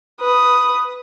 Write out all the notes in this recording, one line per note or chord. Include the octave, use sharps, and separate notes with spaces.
B4 D#6